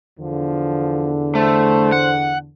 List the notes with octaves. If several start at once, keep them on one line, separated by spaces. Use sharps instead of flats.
E2 D3 F3
A3 C5
F#5